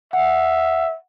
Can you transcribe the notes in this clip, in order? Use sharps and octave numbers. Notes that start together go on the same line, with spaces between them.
E5 F#5